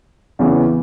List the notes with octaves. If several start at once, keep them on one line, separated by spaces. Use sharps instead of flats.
E2 C#3 E3